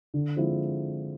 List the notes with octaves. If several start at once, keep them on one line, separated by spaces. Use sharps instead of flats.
D3
F3 G#3 C4 E4